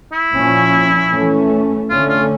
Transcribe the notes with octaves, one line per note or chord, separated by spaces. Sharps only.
E4
A#2 F3 C#4
E3 A3 C#4
D3 A3 C#4 F4
F4